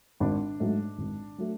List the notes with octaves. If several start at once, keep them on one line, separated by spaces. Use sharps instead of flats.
G#1 D4
G#2 F#3 A3
G#1
F#3 A3